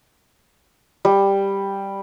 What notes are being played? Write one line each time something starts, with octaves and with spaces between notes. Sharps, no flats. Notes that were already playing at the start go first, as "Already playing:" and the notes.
G3